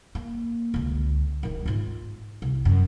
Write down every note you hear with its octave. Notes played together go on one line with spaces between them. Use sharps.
A#3
C#2 D3
D1 D#3
G#2 F4
C2
F#2